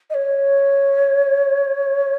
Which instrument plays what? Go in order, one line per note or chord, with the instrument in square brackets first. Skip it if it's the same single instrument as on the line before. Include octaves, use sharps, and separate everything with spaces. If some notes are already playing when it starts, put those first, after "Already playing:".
[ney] D#5
C#5